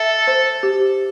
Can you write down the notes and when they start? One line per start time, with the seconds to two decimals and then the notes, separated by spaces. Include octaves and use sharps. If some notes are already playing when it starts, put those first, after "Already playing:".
Already playing: A4 E5
0.27 C5
0.63 G4